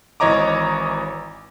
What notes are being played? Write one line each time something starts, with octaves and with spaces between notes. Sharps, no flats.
G#1 E3 C#5 D#5 A#5 D6